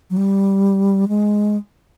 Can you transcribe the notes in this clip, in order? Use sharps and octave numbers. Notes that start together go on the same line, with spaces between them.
F#3
G3
G#3